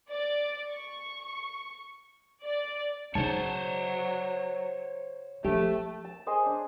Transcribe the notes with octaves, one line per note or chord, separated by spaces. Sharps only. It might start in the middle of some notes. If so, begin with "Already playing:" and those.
D5
C#6
D5
C#3 F#3 D#4 C5 C#5 A5
F3 A3 G4
A5
G#4 C5 D#5 G#5
D4